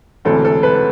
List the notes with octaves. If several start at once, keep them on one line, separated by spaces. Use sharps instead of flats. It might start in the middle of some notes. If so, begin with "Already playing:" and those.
E1 D2 C3 E3 A4
A4
B4